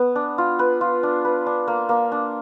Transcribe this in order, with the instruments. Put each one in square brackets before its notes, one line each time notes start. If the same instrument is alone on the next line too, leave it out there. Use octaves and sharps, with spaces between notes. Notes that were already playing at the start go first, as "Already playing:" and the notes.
Already playing: [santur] B3
D4
F4
B4
F4
D4
B4
D4
A#3
A#3
D4